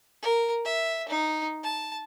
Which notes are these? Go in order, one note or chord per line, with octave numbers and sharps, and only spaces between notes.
A#4
E5
D#4
A5